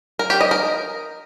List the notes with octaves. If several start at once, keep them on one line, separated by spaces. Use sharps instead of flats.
A#4
G4
D#5
A#4